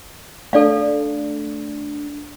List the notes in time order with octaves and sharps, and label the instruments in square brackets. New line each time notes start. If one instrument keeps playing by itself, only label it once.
[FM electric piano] A3 D4 [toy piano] A4 D5 F5